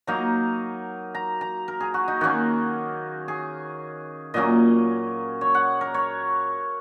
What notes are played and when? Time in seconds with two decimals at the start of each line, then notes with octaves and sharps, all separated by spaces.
0.07 F#3 A#3 D#4 A#5
1.15 A#5
1.41 A#5
1.68 A#4
1.80 G#4
1.94 F#4
2.08 D#4
2.21 D#3 A#3 C#4 F#4
3.28 G#4
4.34 A#2 F#3 A#3 C#4 D#5
5.41 C#5
5.55 F#5
5.81 A#4
5.94 C#5